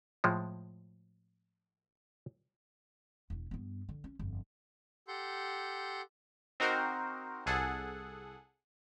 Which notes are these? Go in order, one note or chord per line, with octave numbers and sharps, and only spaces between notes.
A2 F3 G#3
E1 E4
G2 B3
D3
C#4
G1 F2
G4 A4 F#5 C6 G6
C4 D#4 F#4 A#4 C5
C2 G#4 A4 F#5